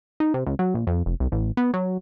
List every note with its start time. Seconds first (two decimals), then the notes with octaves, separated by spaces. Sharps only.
0.20 D#4
0.34 C3
0.46 C#2
0.59 F#3
0.74 A#1
0.87 F2
1.06 F1
1.20 C2
1.32 A1
1.57 B3
1.74 F#3